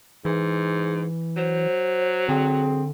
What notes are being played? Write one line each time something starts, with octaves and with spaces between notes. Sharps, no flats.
G#2 E3
F#3 C5
D3 C4 G#4